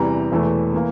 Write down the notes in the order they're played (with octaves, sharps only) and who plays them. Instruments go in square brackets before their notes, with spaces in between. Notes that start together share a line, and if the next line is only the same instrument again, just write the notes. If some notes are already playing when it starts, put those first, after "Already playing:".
Already playing: [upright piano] E2 C3 E3 G3 A#5
E1 E2 E3 A3
E3 A#3